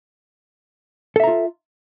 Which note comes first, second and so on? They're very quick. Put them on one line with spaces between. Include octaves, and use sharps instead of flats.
A4 E5 A#5 F4